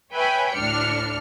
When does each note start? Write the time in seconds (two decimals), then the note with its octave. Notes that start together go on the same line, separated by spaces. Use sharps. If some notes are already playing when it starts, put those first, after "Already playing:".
0.14 B4 C#5 E5 G5 G#5 B5
0.54 D2 A2 D4 F6 C#7